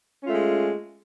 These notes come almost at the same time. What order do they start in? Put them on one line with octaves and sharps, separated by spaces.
C#4 F4 A3 G#3